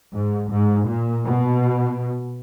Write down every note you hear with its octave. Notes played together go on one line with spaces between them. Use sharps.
G#2
G#2
A#2
B2